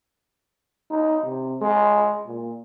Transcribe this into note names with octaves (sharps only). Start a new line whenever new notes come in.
D#4
C3
G#3
A#2